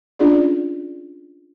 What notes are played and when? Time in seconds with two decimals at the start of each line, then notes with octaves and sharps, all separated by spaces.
0.19 C#4 D4 F4 G#4 D5